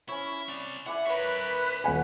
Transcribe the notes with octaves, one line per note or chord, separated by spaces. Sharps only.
C#4 E4 C#5
C4 D5
E4 D5 F#5 G#5
A#4 B4 C#5 E5
D#1 F#5 G#5